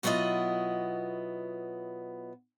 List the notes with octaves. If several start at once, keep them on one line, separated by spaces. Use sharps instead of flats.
B2 F#3 B3 E4 F4 D#5